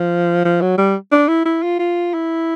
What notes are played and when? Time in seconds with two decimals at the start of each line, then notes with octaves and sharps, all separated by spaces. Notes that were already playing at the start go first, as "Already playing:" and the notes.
Already playing: F3
0.45 F3
0.61 F#3
0.78 G3
1.11 D4
1.28 E4
1.45 E4
1.62 F4
1.79 F4
2.13 E4